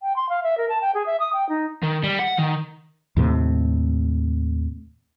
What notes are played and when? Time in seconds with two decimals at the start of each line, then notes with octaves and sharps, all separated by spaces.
0.02 G5
0.16 C6
0.29 F5
0.43 E5
0.57 A#4
0.68 A5
0.81 G5
0.94 G#4
1.06 E5
1.19 D#6
1.33 G5
1.49 D#4
1.83 D#3
2.04 G3
2.19 F#5
2.38 D#3
3.17 D#2 A2 C3